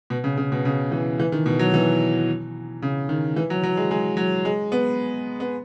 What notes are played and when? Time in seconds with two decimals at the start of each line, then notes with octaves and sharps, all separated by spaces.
0.10 B2
0.24 C#3
0.37 C#3
0.52 B2
0.65 C#3
0.92 E3
1.19 E3
1.32 D#3
1.46 B2
1.59 F#3
1.74 E3
2.82 C#3
3.09 D#3
3.36 E3
3.50 F#3
3.63 F#3
3.77 G#3
3.91 G#3
4.17 F#3
4.45 G#3
4.72 B3
5.40 B3